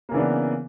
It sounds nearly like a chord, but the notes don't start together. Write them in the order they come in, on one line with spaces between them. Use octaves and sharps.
A#3 C#3 E3 D4 B3